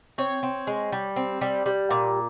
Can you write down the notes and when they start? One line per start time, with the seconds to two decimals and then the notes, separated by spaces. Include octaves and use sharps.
0.18 C4 C#5
0.43 C4
0.67 G#3
0.92 G3
1.16 C4
1.41 G3
1.66 G3
1.90 A#2